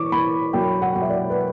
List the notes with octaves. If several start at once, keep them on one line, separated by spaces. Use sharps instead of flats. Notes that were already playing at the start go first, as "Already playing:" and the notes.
Already playing: E3 C#6 D6
E3 B5
F#2 G5
F#5
F#2 F#5
E5
D5
B4